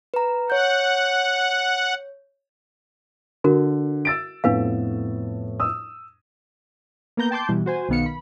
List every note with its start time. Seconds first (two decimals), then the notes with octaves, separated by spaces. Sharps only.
0.14 B4 A#5
0.50 C#5 F#5 G6
3.44 D3 F#4 A#4
4.05 E6 A6 D7
4.44 F2 A2 B3 D4 B4 F5
5.60 D#6 E6
7.17 A#3 B3 A#5 G6
7.31 G5 A5 C6 D6 G6
7.49 B2 E3 G3
7.66 F#4 C5 G#5
7.89 B1 D#3 B3 F5 C#7
8.06 B5